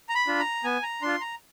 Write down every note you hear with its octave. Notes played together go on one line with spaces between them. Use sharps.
A#5
B5
D4 F4
A#5
B3 G#5
A#5
D4 F4 C6
A#5